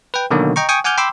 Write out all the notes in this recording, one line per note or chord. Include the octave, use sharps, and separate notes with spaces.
B4 G5
B2 D3 D#3 F#3 A#3
D#5 G5 A#5 C#6
G5 G#5 C#6 D#6
F#5 G#5 D6 F6 G6
G5 B5 C6 D6 E6